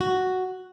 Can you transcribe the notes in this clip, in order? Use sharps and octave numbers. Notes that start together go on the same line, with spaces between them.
F#4